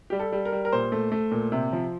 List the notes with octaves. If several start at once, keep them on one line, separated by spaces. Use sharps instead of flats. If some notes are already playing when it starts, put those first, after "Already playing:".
G3 G4
A4
G3
A#4
G3
A#4
A#2 C5
A3
A3
A#2
C3
F3